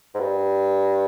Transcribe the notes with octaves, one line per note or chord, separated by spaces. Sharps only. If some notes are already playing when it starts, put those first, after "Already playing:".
G#2
G2